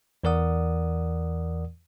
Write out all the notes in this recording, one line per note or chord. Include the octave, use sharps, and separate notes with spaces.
E2 E3 A#4 D5 F#5 D#6